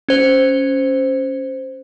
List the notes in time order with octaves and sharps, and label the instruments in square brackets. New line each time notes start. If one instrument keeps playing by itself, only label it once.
[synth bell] C#4 C5